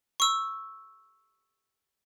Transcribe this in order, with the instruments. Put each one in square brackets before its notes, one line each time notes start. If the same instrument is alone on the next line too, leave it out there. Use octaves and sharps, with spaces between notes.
[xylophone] C#6 E6